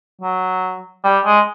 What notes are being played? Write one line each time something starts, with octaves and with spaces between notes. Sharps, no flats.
F#3
G3
G#3